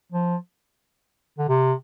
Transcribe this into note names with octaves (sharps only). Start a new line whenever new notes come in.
F3
D3
C3